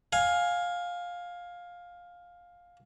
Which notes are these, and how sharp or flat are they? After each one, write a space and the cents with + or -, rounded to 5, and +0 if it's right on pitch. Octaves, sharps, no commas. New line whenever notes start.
F5 +15 G#5 +0